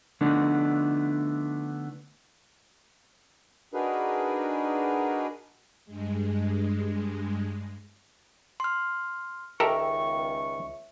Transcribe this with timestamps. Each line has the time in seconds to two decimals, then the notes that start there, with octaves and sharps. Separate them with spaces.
0.21 D3 F3 A3 B3 D4 D#4
3.74 D4 D#4 F#4 G#4 A#4 B4
5.85 G2 G#3
8.60 C6 F6
9.60 C#2 D#3 G4 A4 A#4 E5 C#6